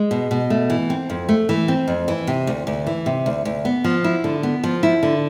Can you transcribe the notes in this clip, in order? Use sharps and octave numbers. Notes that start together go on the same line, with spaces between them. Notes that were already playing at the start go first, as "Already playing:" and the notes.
Already playing: G#3
B2
B2
A3
E3
C4
F2
A3
E3
C4
F2
E3
C3
D2
D2
E3
C3
D2
D2
B3
F3
E4
D3
B3
F3
E4
D3